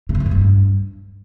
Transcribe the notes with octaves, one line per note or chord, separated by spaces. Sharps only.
C#3
F2
G#2
A#2
G2